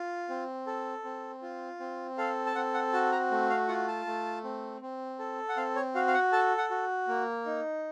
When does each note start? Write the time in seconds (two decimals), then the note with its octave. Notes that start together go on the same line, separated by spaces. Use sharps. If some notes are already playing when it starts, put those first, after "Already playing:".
Already playing: F4
0.29 C4
0.67 A4
1.04 C4
1.42 F4
1.80 C4
2.18 A4 F5
2.46 A5
2.55 C4 F#5
2.74 F#5
2.93 F#4 A5
3.12 A#5
3.31 A3
3.50 F5
3.68 F4 F#5
3.88 A5
4.06 A3
4.44 C4
4.82 C4
5.19 A4
5.49 F#5
5.57 C4 F5
5.76 C#5
5.95 F#4 F5
6.07 F5
6.14 F#5
6.33 A4 A5
6.58 F#5
6.70 F#4
7.08 A#3
7.46 D#4